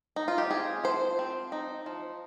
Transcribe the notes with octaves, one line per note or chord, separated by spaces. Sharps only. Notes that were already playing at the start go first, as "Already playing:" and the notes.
D#4
F4
G4
C4 G#4
F3 C5
C4
D#4
F3